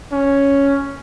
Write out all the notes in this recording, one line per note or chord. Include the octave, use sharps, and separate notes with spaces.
C#4